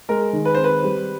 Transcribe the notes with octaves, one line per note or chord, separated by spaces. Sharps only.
G#3 A#4
D#3
B4
C4 C5
B4
G3